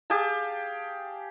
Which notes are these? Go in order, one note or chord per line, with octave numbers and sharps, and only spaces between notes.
G4 G#4 F5 A5